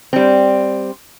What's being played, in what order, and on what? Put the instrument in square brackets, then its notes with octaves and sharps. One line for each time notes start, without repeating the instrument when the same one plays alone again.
[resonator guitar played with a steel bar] G3 C4